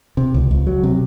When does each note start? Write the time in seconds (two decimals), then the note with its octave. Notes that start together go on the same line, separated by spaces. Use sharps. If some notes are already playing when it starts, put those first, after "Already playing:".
0.17 C3
0.34 C#2
0.51 C#2
0.67 F#3
0.83 C3